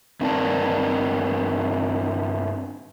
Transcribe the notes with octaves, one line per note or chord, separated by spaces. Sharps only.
G2 C4 D#4 A#4 D5 A5